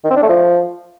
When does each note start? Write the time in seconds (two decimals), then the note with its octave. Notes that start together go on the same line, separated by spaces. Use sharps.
0.04 D#3
0.10 C4
0.16 D4
0.22 A3
0.29 F3